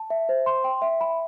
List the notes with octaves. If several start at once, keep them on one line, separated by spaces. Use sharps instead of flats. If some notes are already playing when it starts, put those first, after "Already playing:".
Already playing: A5
E5
C5
C6
G5
E5
B5